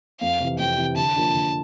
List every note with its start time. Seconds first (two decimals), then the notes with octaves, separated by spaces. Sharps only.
0.21 F2 F5
0.40 C3 E3
0.58 F2 G5
0.78 C3 E3
0.96 D3 A5
1.16 F3 A#3 D4
1.35 D3